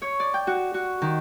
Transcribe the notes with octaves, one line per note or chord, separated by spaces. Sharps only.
C#5
D5
G5
F#4
F#4
D#3